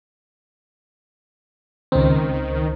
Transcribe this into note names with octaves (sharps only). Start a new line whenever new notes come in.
C#2 D#3 C4